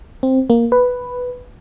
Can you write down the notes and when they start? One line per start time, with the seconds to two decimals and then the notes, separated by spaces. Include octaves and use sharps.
0.23 C4
0.50 A#3
0.72 B4